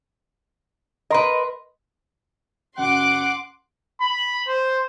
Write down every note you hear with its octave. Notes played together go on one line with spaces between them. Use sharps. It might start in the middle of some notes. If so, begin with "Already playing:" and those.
A#4 B4 D#5 C6
F#2 C#3 F#5 C6 D6 F#6
B5
C5